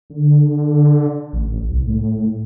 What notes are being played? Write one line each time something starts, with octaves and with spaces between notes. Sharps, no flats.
D3
A1
C2
A2